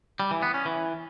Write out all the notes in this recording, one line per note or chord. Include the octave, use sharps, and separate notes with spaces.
G3
E3
B3
C#4
E3